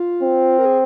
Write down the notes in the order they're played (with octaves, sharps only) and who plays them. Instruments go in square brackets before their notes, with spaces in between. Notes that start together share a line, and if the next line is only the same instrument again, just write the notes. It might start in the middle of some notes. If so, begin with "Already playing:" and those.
Already playing: [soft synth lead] F4
[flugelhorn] C4
[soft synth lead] A#4
G#4